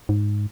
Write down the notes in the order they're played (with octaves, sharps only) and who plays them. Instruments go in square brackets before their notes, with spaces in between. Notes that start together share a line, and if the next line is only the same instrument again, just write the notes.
[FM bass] G#2